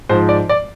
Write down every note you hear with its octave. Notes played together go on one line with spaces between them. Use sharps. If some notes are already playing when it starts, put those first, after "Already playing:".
G#2 F3 C5
D5
D5